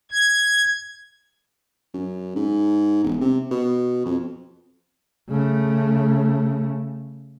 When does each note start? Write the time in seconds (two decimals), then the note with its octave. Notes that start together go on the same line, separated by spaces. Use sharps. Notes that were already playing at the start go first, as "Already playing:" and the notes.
0.11 G#6
1.94 F#2
2.36 G#2
3.03 E1
3.20 C3
3.51 B2
4.05 F2
5.29 C#3 A3